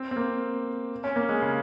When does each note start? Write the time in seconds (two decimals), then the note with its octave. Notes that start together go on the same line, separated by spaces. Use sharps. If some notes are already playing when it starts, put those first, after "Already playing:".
Already playing: C4
0.11 C4
0.16 A#3
1.04 C#4
1.16 A#3
1.29 G#3
1.42 C#3